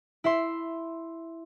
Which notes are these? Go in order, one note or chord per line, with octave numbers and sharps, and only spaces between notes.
E4 E5 C6